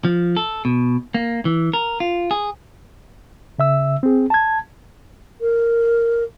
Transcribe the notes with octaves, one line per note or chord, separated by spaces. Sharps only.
F3
A4
B2
A#3
E3
A#4
F4
G#4
C#3 E5 E6
C4 G#4
A5 G#6
A#4